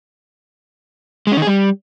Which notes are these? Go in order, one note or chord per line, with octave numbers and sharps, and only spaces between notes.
G#3
C#4
D#3
G#4
G3